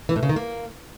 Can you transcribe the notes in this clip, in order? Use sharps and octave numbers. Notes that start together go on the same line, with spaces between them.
E3
A2
C#3
D#3
A#3